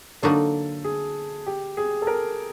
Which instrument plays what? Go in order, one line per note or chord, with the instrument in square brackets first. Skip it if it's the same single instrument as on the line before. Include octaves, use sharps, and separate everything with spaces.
[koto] D3 F#3 A#3 D#4 F#4 [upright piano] A4
[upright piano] G#4
G4
G#4
A4
A#4